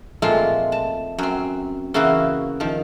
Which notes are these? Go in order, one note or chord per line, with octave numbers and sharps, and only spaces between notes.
A#2 F3 G#3 A3 C4 F4
A5
F#2 C4
C#3 E3 A#3 E4 F#4
D#3 F3